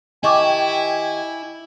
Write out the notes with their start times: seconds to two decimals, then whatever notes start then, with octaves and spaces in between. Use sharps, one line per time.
0.24 D#3 E4 G4 D#5 G#5 A5 C#6 D6